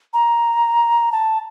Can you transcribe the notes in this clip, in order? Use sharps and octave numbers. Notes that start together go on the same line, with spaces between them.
A#5
A5